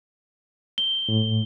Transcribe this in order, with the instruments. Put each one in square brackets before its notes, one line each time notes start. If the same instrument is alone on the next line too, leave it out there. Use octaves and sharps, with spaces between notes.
[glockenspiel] G7
[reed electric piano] A2